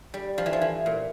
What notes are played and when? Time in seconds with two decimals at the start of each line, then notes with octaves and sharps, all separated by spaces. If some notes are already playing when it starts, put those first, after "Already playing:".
0.14 G3
0.38 F3
0.46 E3
0.53 F3
0.61 E3
0.86 A#2